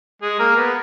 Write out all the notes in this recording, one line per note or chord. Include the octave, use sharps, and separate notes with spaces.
G#3 G#4
A#3 A#4
B3